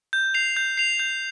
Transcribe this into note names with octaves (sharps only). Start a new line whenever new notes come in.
G6
C7 F7
G6
C7 F7
G6